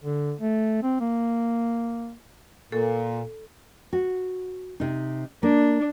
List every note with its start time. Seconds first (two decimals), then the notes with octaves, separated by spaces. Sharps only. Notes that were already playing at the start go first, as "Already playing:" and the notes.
0.04 D3
0.41 A3
0.83 C4
1.00 A#3
2.72 A#2 A4
3.93 F#4
4.80 C3 D#4
5.43 A#3 D4